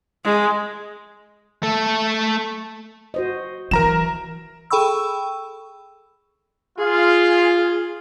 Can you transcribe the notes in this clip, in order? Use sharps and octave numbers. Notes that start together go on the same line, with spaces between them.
G#3
A3 A4
F#4 C5 D#5
E3 A#4 A#5 E7
G#4 A4 G5 B5 C#6 E6
F4 G#4